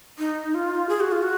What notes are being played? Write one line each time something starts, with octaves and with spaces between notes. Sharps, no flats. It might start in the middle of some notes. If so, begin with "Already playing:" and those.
D#4
F4
G#4
F#4
F4
F#4